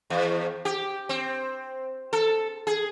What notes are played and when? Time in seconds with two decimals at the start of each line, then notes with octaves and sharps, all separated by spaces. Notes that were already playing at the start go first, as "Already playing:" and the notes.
0.10 E2
0.65 G4
1.09 C4
2.13 A4
2.67 G#4